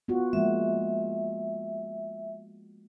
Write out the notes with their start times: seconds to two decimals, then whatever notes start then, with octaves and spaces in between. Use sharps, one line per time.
0.08 B3 F4 F#4
0.33 F3 G#3 A#3 E5